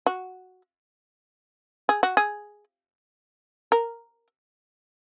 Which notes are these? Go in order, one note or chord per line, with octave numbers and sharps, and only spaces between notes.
F#4
G#4
F#4
G#4
A#4